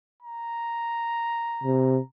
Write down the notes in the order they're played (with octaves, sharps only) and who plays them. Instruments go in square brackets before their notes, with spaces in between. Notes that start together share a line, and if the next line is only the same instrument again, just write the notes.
[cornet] A#5
[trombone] C3